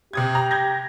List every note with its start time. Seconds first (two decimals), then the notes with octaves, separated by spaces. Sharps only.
0.13 C3 G4 D#6 G#6
0.35 A#5
0.51 G6 G#6 A#6